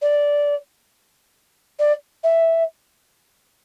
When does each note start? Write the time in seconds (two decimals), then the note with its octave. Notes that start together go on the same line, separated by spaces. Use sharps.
0.02 D5
1.79 D5
2.23 E5